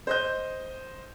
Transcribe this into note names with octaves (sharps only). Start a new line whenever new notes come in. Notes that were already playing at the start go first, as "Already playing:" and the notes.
C5 D#5 G6